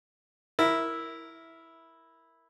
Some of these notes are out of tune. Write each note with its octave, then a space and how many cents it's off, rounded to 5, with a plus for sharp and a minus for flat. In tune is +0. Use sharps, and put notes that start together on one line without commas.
E4 -5 A#4 +0